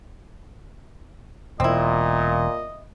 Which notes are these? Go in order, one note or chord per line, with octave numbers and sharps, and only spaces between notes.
E1 A#2 C4 E4 D#5